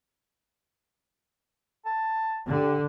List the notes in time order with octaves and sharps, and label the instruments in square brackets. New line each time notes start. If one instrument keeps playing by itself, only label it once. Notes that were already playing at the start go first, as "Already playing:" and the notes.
[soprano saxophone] A5
[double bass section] D3 [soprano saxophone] G4